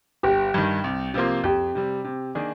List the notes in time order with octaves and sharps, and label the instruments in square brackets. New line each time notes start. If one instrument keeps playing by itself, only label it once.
[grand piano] G1 [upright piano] G4
[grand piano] G2 D#3
C2
C3 F3 A#3 F4
[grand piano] F2 [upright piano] G4
[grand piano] C3 G3
C3
D#3 A#3 D4 G#4